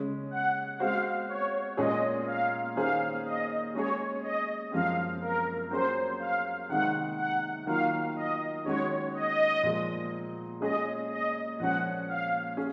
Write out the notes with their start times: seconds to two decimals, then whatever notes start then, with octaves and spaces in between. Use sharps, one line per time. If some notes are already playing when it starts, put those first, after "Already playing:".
Already playing: C#3 G#3 C#4
0.31 F#5
0.79 G#3 C4 F#4 C5 F5
1.28 C#5
1.77 A#2 G#3 C#4 G#4 C#5 D#5
2.27 F5
2.76 D#3 A#3 C#4 G#4 C5 F5
3.26 D#5
3.74 G#3 C#4 G#4 C#5
4.23 D#5
4.72 F#2 F3 G#3 C4 F5
5.21 A#4
5.70 F#3 A#3 C#4 G#4 C5
6.19 F5
6.69 C3 D#3 G#3 F#5
7.17 F#5
7.66 D#3 F#3 A#3 F4 F5
8.16 D#5
8.65 D#3 G#3 C#4 F#4 C#5
9.14 D#5
9.63 A#2 F3 G#3
10.61 G#3 C#4 G#4 D#5
11.10 D#5
11.59 A#2 F3 G#3 C#4 F#5
12.08 F5
12.57 C#4 G#4